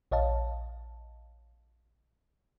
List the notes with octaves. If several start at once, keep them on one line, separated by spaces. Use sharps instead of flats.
A#1 C#5 D#5 F5 A5